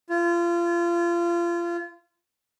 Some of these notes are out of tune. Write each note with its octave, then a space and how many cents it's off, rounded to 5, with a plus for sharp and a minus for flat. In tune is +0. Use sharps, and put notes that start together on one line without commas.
F4 -30